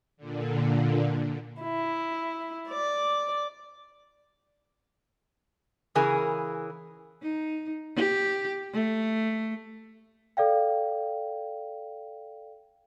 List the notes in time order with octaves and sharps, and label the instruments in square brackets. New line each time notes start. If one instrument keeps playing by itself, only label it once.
[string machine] A#2 D3
[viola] E4
D5
[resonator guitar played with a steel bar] C#3 E3 G#4 A#4
[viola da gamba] D#4
G4
A3
[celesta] A4 D5 F5 G5